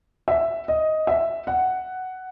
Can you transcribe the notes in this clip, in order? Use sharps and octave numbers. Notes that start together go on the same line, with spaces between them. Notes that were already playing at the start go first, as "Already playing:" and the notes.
E5
D#5
E5
F#5